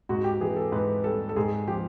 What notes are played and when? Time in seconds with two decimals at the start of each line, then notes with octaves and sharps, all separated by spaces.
0.09 G#2 F#4
0.24 G4
0.41 E3 G#4
0.56 A4
0.72 G#2 B4
1.04 G3 A4
1.29 A4
1.36 G#2 G#4
1.67 F3 G4